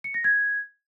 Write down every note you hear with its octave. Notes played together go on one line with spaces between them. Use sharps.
C#7
A#6
G#6